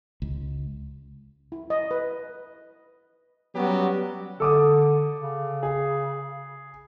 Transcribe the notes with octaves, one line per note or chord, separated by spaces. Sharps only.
C#2
E4
D#5
B4
F#3 G3 B3 C#4 F#4 G4
D3 A4 D6 D#6
C#3
G#4